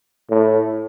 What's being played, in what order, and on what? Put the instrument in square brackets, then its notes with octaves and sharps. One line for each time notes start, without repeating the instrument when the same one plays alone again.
[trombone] A2